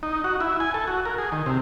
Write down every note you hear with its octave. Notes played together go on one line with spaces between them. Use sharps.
D#4
F#4
E4
G#5
A4
F#4
A#4
G#4
D#3
C3